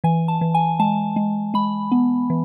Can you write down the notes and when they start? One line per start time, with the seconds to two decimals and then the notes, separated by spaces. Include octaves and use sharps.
0.04 E3 G#5
0.28 A5
0.41 E3
0.54 G#5
0.79 G#3 A5
1.16 G#3
1.54 G#3 B5
1.92 B3
2.30 E3